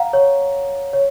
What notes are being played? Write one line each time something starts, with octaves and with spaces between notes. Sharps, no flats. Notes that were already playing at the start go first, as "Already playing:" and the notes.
Already playing: F5 F#5 A#5
C#5
C#5